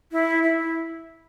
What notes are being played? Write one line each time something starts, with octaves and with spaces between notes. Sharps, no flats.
E4
E4